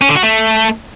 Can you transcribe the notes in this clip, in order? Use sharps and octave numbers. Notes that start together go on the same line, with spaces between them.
C#4
D3
F#4
A3